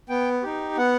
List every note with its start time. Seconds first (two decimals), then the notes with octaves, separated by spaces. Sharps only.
0.09 B3 G5
0.43 D#4 G4
0.77 B3 F#5